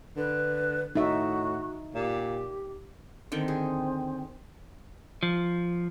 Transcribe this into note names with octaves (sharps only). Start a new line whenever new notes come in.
D3 B4
A2 D#4 F#4 E5
A#2 G4
D3 D#3 C4 G5
G#4
F3